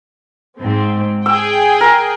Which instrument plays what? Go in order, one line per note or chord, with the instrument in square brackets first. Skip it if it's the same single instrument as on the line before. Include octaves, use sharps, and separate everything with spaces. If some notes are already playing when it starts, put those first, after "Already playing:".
[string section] G#2 C4
[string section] G#4 G5 [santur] E6
[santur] A#4